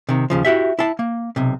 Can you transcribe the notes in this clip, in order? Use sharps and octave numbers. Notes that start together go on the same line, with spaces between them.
C3 D#3
D#2 C#3 F3
E4 F#4 G4 E5
E4 A5
A#3
B1 C3